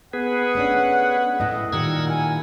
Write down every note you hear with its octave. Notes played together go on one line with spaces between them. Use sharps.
B3 G#4 B4 F#5
A3 C#4 D4
A2 A3 D#5
A#2 D#3 G3 A#4 F#5 E6 G#6
E4 G#5